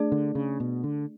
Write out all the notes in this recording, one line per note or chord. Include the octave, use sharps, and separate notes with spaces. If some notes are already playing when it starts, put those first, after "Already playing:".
Already playing: A3 D4 G#4 D5
D3
C#3
B2
D3